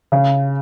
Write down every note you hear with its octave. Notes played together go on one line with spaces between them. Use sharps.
C#3